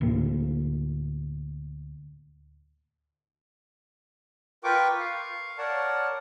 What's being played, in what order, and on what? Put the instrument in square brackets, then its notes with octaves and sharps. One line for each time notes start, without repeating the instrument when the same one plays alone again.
[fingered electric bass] D2 A2 A#3
[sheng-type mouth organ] F4 A#4 B4 G5 C#6 D6
F5 C#6
A#4 C#5 D5 F#5 A5